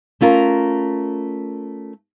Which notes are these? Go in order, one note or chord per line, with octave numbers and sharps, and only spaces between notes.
A3 C#4 F4 A#4